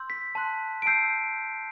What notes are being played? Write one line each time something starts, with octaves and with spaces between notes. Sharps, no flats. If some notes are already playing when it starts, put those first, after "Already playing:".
Already playing: C6 E6 G6
B6
A5 C6 F#6
D7
A5 E6 G6 C7